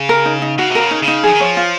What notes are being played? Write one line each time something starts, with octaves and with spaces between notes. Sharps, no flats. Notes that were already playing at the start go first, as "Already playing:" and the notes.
Already playing: C#3
A#4
D#4
D#4
C#3 F#4
C3
C#3 A#4
D#4
C#3
D#4
F3 G#4
D#3
F3 C#5
F4